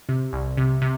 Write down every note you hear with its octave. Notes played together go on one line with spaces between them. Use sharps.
C3
C2
C3
C3